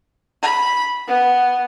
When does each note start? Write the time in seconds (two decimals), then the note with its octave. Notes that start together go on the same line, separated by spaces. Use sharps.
0.42 B5
1.08 B3